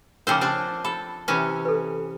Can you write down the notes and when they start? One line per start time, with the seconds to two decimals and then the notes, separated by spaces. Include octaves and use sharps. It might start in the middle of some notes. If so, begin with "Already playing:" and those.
0.27 C#3 F3 A#4 C5 G5 D6
0.41 C4 D4
0.85 A4 B5
1.28 C3 E3 C#4
1.65 A4 B4